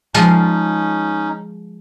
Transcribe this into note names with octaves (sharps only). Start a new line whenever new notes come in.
F3 G#3 C#4 D#4 F4